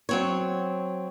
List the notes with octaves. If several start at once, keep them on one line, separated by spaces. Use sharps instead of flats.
F#3 C4 C#5